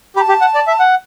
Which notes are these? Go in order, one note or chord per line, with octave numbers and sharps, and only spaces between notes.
G4 B5
A5
G4
F#5
D5
E5
F#5